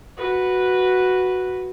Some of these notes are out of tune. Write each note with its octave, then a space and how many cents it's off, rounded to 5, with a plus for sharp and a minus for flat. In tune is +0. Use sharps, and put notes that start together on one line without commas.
F#4 +0 B4 -5